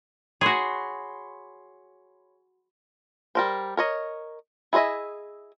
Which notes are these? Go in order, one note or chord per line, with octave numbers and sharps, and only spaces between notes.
F#4 G#4 C#5 B5 C6
G3 A#4 C5
A#4 C#5 D#5
E4 G#4 C5 D#5 E5